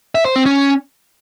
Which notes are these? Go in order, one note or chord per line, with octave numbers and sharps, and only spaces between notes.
E5
C5
C4
C#4